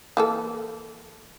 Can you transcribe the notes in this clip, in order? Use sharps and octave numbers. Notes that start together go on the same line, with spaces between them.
E3 A#3 A4